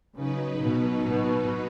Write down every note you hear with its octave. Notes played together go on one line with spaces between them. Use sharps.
C#3 F#3 D#4 B4
B2
B2